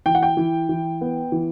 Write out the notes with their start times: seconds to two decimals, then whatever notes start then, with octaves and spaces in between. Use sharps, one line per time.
0.06 E3 G5
0.15 F#5
0.23 G5
0.37 E3
0.69 E3
1.01 B3
1.32 E3